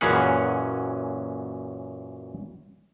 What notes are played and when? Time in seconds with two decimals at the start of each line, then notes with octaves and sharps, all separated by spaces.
0.01 F#2 A#2 E3 C#4 G#4 F#5